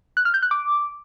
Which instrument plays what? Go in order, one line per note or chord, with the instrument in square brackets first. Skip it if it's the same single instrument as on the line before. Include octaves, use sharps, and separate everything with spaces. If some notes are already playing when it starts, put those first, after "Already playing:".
[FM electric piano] F#6
F6
G6
F#6
D6